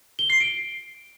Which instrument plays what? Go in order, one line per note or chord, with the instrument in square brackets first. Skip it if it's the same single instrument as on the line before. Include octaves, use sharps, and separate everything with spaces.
[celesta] G7
C7
D7